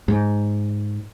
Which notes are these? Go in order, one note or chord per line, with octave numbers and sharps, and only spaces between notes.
G#2